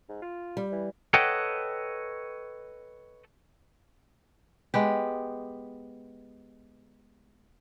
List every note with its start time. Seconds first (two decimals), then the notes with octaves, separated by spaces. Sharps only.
0.09 G#2
0.22 F4
0.57 G3
0.72 E3
1.14 A4 B4 C#5 D#5 F#5 G5
4.74 G#3 B3 G4